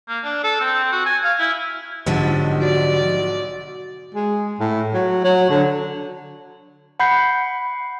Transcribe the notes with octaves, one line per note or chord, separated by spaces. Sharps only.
A#3
D4
A4
C4
F#4
G#5
F5
E4
B1 G#2 D3 F3 G3
F#4 D5
G#3
A2
F#3
F#3
D3
F#5 B5 G6 C7